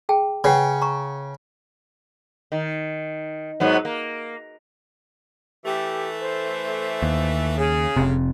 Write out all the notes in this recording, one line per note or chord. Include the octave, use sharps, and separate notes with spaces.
G#4 G5 A5
C#3 B4 F#5 G5
A#5 C#6
D#3
G#2 F#3 B3
A#3
E3 A3 G4
C5
D#2
C#3 G#4
F1 C3